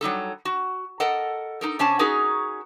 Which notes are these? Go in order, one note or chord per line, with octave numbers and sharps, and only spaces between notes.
F#3 G3 D#4 A4
F#4
A4 A#4 D#5 F#5
D#4 A4 A#4
C3 C#4 D4 G#5 A5
C#4 D#4 F#4 G#4 A#4